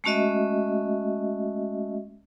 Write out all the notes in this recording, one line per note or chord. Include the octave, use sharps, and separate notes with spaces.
G#3 A3 C#4 F#4 D#5 E5